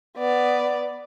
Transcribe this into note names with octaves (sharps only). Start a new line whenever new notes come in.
B3 D5